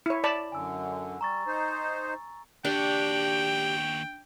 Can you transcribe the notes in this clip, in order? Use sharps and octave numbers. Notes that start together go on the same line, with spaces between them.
E4 C#5
D5 A5 B5
F#2 D3 G#5 E6
G3 A#5 C#6 A6
D#4 C5
D#2 D4 F#4 G4 G5